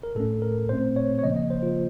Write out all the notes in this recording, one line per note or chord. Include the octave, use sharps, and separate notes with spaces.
A#4
A2 A3 C#4 A4
A#4
A#2 A3 C4 C5
C#5
C#5
C#3 F3 A#3 C#4 D#5
D#5
C5
F4